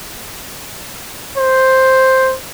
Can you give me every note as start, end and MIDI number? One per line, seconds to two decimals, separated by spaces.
1.38 2.35 72